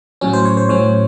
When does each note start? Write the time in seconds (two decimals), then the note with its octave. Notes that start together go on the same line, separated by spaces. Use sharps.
0.21 A2 F#3 C#4
0.33 C5
0.45 C#5
0.57 C5
0.69 A2 F#3 C#4 C#5